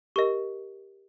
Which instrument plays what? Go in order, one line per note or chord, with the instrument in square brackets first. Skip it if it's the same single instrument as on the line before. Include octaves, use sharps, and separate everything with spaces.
[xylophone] G4 A#4 D#5 C#6